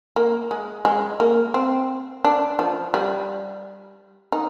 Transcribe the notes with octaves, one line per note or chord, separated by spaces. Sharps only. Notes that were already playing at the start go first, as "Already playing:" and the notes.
A#3
G#3
G#3
A#3
C4
D4
F3
G3
D#4